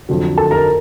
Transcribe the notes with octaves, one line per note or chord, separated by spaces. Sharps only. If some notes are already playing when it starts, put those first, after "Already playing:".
F2 D3 F#3
A4 A5
A#4 A#5